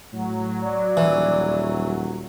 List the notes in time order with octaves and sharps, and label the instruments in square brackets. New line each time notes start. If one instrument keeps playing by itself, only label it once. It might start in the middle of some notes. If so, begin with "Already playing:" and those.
[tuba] A2 [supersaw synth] F#3
[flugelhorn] D5
[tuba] D#1 [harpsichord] E3